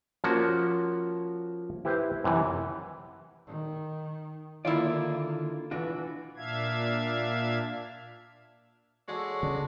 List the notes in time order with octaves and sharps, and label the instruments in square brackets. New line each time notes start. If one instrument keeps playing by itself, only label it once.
[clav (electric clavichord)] F3 A#3 C#4 F#4
E4 G4 B4 C5
F#2 C3 E3
[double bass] D#3
[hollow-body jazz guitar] D3 D#3 D5 [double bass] A#3 [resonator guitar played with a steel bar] E4 F4
[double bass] E3 [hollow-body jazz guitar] D4 F4 F#4
[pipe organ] A#2 D4 E5 F5 G#6
[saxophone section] G#3 F#4 [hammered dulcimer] A4 C#5 D5
[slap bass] C#3 [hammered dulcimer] D4